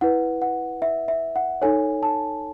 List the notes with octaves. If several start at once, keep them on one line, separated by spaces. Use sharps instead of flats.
E4 B4 F#5
F#5
E5
E5
F#5
D#4 A4 C#5 G#5
A5